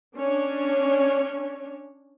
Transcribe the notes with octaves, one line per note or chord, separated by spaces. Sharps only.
C#4 D4 C#5